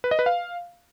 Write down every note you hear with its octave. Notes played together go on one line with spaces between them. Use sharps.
B4
D#5
B4
F5